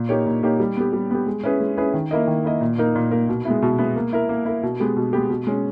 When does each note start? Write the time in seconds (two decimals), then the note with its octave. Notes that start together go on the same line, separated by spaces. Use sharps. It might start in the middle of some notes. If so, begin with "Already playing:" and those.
Already playing: A#2
0.09 A#3 D#4 G4 C#5
0.26 A#2
0.43 A#3 D#4 G4 C#5
0.60 G3
0.77 B3 G4
0.93 G3
1.11 B3 G4
1.27 G#3
1.44 C#4 E4 G#4 B4
1.60 G#3
1.78 C#4 E4 G#4 B4
1.94 D#3
2.11 A#3 E4 A#4 D#5
2.27 D#3
2.44 A#3 E4 A#4 D#5
2.61 A#2
2.78 A#3 D#4 A#4
2.95 A#2
3.11 A#3 D#4 A#4
3.29 B2
3.45 G#3 B3 E4
3.62 B2
3.79 G#3 B3 E4
3.96 A#3
4.13 E4 A#4
4.29 A#3
4.46 E4 A#4
4.63 B2
4.80 G#3 B3 G4
4.96 B2
5.13 G#3 B3 G4
5.30 B2
5.47 G#3 C#4